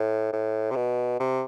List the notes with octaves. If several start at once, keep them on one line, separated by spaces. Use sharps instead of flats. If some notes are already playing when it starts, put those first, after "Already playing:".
Already playing: A2
A2
C3
B2
C3